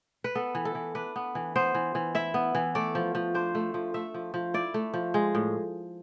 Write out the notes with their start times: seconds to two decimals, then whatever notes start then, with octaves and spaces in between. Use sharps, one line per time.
0.24 B4
0.35 B3 A4
0.55 E3
0.65 A4
0.75 E3
0.95 D4 B4
1.16 B3
1.35 E3
1.56 B3 C5
1.74 E3
1.95 E3
2.15 E4 E5
2.34 B3
2.55 E3
2.75 A3 D5
2.95 F3
3.15 F3
3.34 D4 C5
3.55 A3
3.74 F3
3.94 A3 E5
4.14 F3
4.34 F3
4.54 E4 D5
4.74 A3
4.94 F3
5.14 G#3
5.35 A2